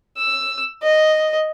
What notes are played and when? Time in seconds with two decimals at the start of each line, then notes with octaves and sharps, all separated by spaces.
0.18 E6
0.83 D#5